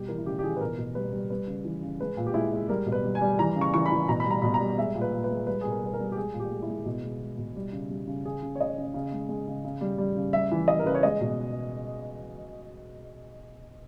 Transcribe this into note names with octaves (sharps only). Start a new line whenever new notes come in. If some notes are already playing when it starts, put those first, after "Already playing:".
Already playing: B2 G3 G4
E3 A#4
E4
C#3 G4
G4
E3 G#4
B4
B2 A#4
B2
G3 B4
G3
G3 B4
C#3
E3
C#3
G#3 B4
A#2
G4
G#3 E4
G#3
G3 A#4
B2
B4
G3
G#5
G3
E3 A#5
C#3
C#6
E3 C#6
B5
E3
B2 A#5
B5
G3 A#5
B2 B5
A#5
G3
G#3 E5
A#2
B4
A#2
B4
G#3
G3 B4
G#4
B2
A#4
G3 B4
A#4
G3
G4
G#3 G#4
A#2
G4
G#3
E4
G#3
B2
G#3
G#3
B2
G3
C#3
G3
C#3
C#3 G#4
C#3
C#5
C#3 D#5
C#3
C#3
G#3
G#3
C#3
C#3
G3
G3
C#3
G3 E5
E3
G3 D#5
A#4
C#3 B4
C#5
G#3 D#5
B2